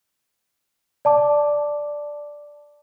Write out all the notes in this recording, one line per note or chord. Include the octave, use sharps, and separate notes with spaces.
D5 A5 D6